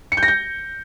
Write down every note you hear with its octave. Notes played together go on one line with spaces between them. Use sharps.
C#7
G6
A#6
G6